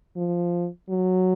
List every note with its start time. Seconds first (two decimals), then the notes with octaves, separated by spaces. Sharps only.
0.17 F3
0.89 F#3